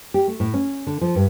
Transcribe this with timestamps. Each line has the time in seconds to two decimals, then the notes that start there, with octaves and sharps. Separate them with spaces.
0.14 G4
0.28 A3
0.40 A2
0.54 C#4
0.87 D3
1.01 F3
1.15 G2